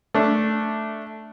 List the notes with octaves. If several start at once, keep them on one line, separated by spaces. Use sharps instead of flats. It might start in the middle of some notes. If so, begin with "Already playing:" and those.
A3 D4